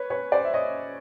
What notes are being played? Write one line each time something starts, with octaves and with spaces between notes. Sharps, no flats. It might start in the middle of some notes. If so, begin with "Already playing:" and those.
Already playing: B4 C#5
B4 C#5
C5 D5
E5
C#5 D#5